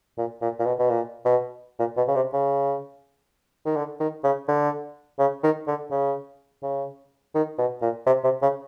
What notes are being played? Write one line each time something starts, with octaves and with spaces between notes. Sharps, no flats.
A#2
A#2
A#2
B2
B2
A#2
B2
A#2
B2
C#3
C3
C#3
D#3
D3
D#3
C#3
D3
C#3
D#3
D3
C#3
C#3
D#3
B2
A#2
C3
C3
C#3